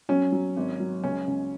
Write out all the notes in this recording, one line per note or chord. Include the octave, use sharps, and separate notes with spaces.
F#3 C#4
F#3
G#1
F#3
C#2 C#4
C#2